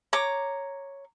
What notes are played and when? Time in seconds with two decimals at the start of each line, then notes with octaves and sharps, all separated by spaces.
0.13 C#5 A#5 D6